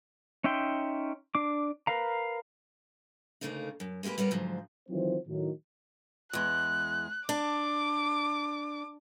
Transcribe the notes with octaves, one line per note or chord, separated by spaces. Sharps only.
C#4 D#4 E5 G5 C6
D4 D6
A#4 B4 F5 A#5
D2 G2 C#3 A3 A#3 D#4
F#2
G#3 A#3 D#4 G4 B4
G3 B3 C#4 A#4
D2 G#2 F3 F#3
D#3 E3 F#3 C4 F4 C5
A2 D#3 F#3
E2 G#3 F#6
D4 D6